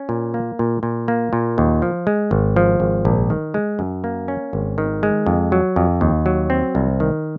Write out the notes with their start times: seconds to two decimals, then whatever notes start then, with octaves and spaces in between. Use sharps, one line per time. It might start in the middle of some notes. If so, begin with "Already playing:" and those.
Already playing: C#4
0.09 A#2
0.34 A#3
0.59 A#2
0.83 A#2
1.08 A#3
1.33 A#2
1.58 D#2
1.82 F3
2.07 G#3
2.31 G#1
2.56 F3
2.80 G#1
3.05 A#1
3.30 D#3
3.54 G#3
3.79 F#2
4.04 A#3
4.28 C#4
4.53 G#1
4.78 D#3
5.03 G#3
5.26 F2
5.52 F#3
5.76 F2
6.01 D#2
6.26 F#3
6.50 C4
6.75 C2
7.00 D#3